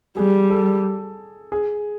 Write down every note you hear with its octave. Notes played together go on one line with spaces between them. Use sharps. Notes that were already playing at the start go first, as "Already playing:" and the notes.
G3 G#4
A4
G#4